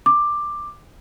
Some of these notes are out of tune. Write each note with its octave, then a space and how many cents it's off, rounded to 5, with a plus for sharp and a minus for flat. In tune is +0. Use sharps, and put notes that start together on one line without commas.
D6 +10